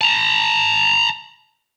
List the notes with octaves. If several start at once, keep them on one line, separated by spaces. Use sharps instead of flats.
A5 A#5